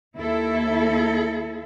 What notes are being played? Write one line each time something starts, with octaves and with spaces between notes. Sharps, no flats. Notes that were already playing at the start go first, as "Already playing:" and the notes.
D#2 E4 A4